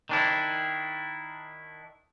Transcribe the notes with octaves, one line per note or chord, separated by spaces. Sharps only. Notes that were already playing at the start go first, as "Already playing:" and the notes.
D#3 D4 E4